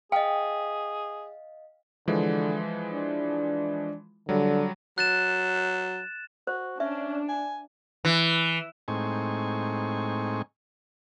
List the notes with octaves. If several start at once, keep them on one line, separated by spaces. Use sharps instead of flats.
G#4 D#5 F5 G5
D3 E3 F3 G#3
D4
D3 F#3 G3
F#3 F#6 A6 E7
F#4 C5
C#4 D4 E5
G#5
E3
A2 G#3 C4 D#4 G#5 C#6